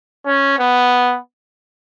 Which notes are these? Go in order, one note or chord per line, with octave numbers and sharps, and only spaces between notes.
C#4
B3